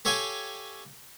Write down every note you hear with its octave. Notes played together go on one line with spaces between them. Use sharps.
G4 A4 C#5 F5 G5 G#5